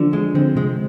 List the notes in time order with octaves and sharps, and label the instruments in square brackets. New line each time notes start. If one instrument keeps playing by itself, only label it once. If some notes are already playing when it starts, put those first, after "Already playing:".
Already playing: [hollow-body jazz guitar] D3 [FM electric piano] F3
[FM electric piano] F3 [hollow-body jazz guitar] G#3
[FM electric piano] D3 [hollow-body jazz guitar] C4
[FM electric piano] C3 [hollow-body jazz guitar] G#3